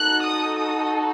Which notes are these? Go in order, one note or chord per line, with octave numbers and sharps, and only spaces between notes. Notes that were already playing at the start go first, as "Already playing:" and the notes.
Already playing: D#4 F#4 A4 F#6
D#6
D#6